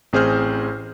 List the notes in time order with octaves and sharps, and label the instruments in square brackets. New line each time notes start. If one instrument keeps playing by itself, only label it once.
[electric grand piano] A1 C4 G#4 C5 F6 G6